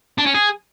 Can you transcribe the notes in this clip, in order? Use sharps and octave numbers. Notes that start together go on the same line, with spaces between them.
D4
C#4
G#4